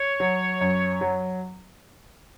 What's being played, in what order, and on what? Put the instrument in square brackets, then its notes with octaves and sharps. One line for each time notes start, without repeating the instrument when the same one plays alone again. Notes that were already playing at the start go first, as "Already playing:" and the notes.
Already playing: [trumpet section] C#5
[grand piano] F#3
F#2
F#3